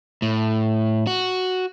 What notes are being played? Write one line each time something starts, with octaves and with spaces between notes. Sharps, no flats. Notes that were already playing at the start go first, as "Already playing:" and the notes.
A2
F#4